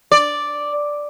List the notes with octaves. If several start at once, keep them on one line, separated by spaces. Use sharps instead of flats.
D5